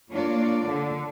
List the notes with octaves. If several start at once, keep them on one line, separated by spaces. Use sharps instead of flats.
A#3 D4 F4 C#5 D5
D3